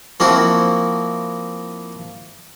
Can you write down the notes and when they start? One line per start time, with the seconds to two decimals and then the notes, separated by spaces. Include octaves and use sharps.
0.20 F3 A#3 C4 E4 F#4